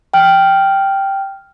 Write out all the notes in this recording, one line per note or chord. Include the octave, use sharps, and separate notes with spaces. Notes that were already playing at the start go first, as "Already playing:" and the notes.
G5 F6